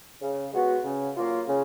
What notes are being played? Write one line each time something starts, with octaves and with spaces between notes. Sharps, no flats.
C#3
G#3 B3 F#4
C#3
F#3 A#3 F4
C#3